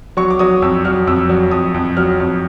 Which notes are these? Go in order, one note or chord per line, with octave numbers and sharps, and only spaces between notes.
F#3 C#6
D6
F#3 D#6
F2 E6
F#3 F6
F2 E6
F#3
F2 D#6
F2
F#3 F6
F2